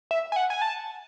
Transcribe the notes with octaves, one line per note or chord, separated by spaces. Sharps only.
E5
G#5
F#5
G#5
A5